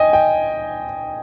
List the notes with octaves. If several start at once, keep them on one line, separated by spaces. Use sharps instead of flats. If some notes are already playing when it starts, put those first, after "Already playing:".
Already playing: D#5 G5 G#5
G5